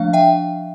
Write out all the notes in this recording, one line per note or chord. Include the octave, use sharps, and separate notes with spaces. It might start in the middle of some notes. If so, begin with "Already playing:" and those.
Already playing: F3 A3 D4 F5
E5 G5